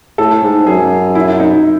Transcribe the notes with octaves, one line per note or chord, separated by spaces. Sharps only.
A2 A4
G#2
F#2 G#4
E4
D#4